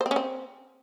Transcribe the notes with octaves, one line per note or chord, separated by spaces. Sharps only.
C5
C4
C#4
C4